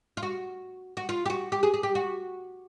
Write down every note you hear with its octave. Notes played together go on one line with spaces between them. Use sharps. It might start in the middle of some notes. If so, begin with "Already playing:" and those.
F4
F#4
F#4
F4
G4
F#4
G4
G#4
G#4
G4
F#4